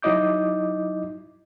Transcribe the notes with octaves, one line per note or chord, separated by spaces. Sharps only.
F#3 D#4 E4 D#5 D6 G6